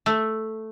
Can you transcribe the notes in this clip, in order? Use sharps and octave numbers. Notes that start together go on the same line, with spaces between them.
A3